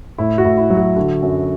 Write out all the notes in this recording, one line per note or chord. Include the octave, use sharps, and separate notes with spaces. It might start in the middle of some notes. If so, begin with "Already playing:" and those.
A2 E4
F#4
A2
E4
F#3
F#4
D3 F#4
F#2